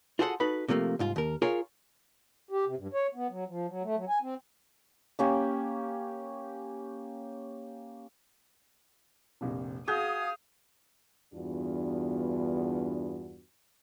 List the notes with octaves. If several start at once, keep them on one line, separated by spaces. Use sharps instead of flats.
F4 F#4 G#4 A4 C5 F#5
D#4 F#4 A4 B4 B5
C3 F3 A3 A#3
C2 G#2 F4
D#2 A#4
F4 G#4 A#4 C#5 F5
G4
C3
G2
C#5
B3
F#3
F3
F#3
A3
F#3
G#5
C4
A#3 C#4 G4
F1 A#1 C3
F#4 G#4 F5 D#6 G6
E2 G2 B3 D4 F4 F#4